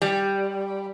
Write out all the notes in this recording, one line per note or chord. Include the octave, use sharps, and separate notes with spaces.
G3